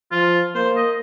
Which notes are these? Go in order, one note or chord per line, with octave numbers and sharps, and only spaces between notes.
F3 F4
A#3 C5
D#5